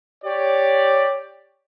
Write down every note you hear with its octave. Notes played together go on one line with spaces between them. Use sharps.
G4 C#5 D5